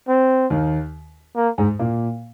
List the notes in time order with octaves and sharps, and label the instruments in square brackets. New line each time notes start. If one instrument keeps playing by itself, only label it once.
[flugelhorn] C4
[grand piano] D#2 D#3
[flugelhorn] A#3
[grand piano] G#2 G#3
A#2 A#3